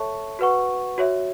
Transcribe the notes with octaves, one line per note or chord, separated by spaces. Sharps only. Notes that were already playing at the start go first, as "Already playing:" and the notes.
Already playing: A4 C#5 E5 A5 C#6
F#4 B4 F#5 C#6
F#4 C#5 E5